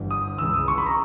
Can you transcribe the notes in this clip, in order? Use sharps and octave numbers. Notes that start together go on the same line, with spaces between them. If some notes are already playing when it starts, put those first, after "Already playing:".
Already playing: G1 G2 E3
D#6
C#2 C#3 E3 E6
D#6
C#6
B5
A#5